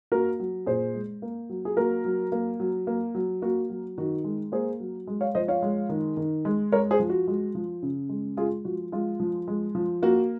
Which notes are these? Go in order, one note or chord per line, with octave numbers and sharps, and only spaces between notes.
A#3 F#4 A#4
F#3
A#2 G#4 C5
G#3
A#3
F#3
G#4
A#3 F#4 A#4
F#3
A#3
F#3
A#3
F#3
A#3 F#4
F#3
D#3 F#4
G#3
A#3 G#4 C5
F#3
G#3
C#5 F5
F3 C5 D#5
C#5 F5
G#3
D#3
D#3
G#3
G#3 A#4 C#5
G#4 C5
F3
F#4
G#3
F3
C#3
G#3
G#3 F4 G#4
F3 F#4
G#3 F4
F3
G#3
F3
A#3 F#4